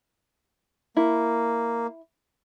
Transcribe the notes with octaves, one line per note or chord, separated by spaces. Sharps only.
A#3 E4